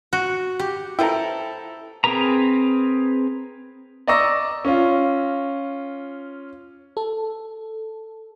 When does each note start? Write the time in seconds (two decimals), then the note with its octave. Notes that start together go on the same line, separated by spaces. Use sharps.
0.13 F#4
0.59 G4
0.99 F3 E4 A4 B4 G5 A#5
2.04 C4 G#4 A#4 B4 A#5
4.08 D5 D#5 A#5 C#6 E6 A#6
4.65 C#4 F4
6.97 A4